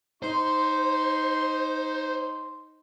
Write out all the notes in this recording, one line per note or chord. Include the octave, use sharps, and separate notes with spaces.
D#4 C5 C6